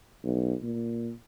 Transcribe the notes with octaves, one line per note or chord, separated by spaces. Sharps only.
B1
A#2